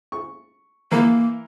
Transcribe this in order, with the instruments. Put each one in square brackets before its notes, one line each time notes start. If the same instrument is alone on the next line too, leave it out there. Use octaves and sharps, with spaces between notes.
[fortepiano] C#6
[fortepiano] E3 A#4 [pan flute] A#3